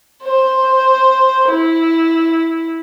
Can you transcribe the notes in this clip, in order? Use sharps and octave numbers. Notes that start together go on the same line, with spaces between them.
C5
E4